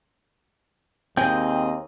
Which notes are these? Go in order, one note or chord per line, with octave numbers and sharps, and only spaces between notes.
D#2 G#3 C4 G#4 D#5 G5